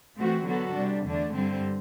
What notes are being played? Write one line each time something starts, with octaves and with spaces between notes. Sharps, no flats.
E3 A3 C4 F#4
D3 F#3 B3 F#4 A4
C3 G3 D4
E2 D3 A3 D4
G2 D3 G3 C4